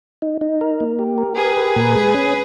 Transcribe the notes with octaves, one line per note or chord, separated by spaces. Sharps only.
D#4
D#4
A#4
A#3
G4
A#4
G4 G#4 B4
A#4
A#2
G#3
C#4